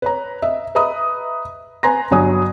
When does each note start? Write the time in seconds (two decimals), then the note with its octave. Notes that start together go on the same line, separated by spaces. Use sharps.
0.02 B4 C#5 A#5
0.42 D#5 E5
0.75 B4 D#5 E5 A#5 B5 D#6
1.83 B4 G#5 A#5 C6 A#6
2.11 G1 F#3 G#5 D#6